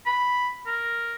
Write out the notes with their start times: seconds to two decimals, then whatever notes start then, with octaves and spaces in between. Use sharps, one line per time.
0.06 B5
0.66 A#4